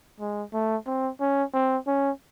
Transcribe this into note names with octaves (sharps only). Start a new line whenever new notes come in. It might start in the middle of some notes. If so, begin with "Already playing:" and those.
G#3
A3
C4
C#4
C4
C#4